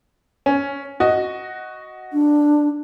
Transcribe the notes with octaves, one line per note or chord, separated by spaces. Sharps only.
C#4
F#4 D#5
D4